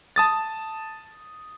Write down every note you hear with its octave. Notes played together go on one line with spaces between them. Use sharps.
A5 D#6 A6